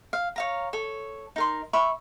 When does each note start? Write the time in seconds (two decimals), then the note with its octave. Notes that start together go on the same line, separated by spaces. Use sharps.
0.13 F5
0.36 C#5 F5 A#5
0.73 A4 C#5
1.36 D#4 A#4 C6
1.73 E5 B5 C#6